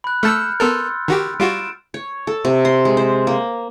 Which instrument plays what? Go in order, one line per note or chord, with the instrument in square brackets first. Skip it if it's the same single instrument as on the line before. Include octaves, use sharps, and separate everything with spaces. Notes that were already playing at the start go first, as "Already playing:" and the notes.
[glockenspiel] B5 F#6
[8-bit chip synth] A3 A5 E6 [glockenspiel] F6 G6 C#7
[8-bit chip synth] B3 A4 A#4 [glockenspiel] C6 E6 A6
[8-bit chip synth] D#3 F#4 G4
[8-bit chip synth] G3 F4 F#4 [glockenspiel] D7 E7
[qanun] C#5
A4
C3
C6
G#3
C5
A#3